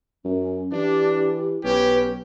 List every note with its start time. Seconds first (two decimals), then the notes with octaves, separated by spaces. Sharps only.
0.25 F#2 C#4
0.72 E3 D4 G4
1.64 B1 C#4 G4 B4